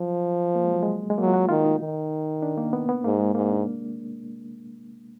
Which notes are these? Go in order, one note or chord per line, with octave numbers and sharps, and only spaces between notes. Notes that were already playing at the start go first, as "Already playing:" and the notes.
Already playing: F3 F#3
A#3
G#3
F#3
G#3
G#3
F#3 A#3
F4
F#4
D#3 F4
D#4
D#3
D4
A#3
B3
B3
G#2 A#3
G#3
G#2 A#3
D4